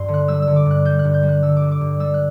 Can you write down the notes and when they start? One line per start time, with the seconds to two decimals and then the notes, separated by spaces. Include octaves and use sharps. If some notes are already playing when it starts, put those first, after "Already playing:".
Already playing: G2 C6
0.08 D3
0.14 F#6
0.28 G3 E6
0.42 E6
0.47 D3
0.56 D6
0.66 G2 F#6
0.85 G3 G6
0.99 F#6
1.05 G2
1.14 G6
1.23 G3
1.29 F#6
1.43 D3 E6
1.57 D6
1.62 G3
1.71 D6
1.81 G2
2.00 G3 E6
2.14 F#6